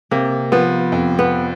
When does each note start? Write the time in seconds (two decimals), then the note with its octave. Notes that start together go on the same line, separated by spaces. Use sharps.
0.11 C3 A#3
0.52 F3 B3
0.92 F2
1.19 B3